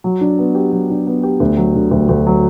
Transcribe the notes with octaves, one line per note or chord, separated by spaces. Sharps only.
F#3
D4
B3
G4
F#3
D4
B3
G4
D2
F#3
D3
D2
D2
F#3